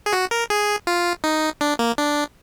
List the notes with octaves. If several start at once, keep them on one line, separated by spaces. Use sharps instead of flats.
G#4
F#4
A#4
G#4
F4
D#4
D4
A#3
D4